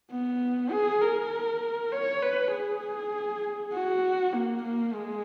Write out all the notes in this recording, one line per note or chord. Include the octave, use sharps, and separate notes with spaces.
B3
G#4
A#4
C#5
B4
G#4
F#4
A#3
A#3
G#3